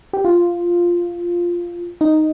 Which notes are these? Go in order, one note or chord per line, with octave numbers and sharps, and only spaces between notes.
G4
F4
D#4